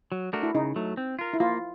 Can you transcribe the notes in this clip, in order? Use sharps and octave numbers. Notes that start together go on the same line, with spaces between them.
F#3
A3 D4 F#4 A#4
E4
C#3 D#4
F#3 A3
C4
F4 A#4
E4
A#3 F4